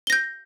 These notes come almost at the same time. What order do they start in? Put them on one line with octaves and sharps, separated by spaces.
G7 A#6 G6